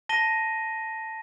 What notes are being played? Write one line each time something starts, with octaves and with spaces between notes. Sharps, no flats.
A5 A#6 D#7 G7